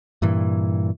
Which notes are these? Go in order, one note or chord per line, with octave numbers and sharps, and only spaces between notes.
G2 A#2 E3